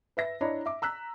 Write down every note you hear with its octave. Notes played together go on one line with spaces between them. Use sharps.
B4 E5 A#6
D4 E4 C#5 D#5 A#5 B5
E5 D6
A#5 E6 F#6 B6